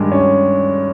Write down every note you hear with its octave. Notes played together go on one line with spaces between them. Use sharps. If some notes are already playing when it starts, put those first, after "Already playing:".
Already playing: G2 D#3 G#3
C#4